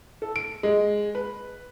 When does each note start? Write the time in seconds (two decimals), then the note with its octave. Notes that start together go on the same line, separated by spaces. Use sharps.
0.22 A4
0.36 D7
0.63 G#3
1.15 B4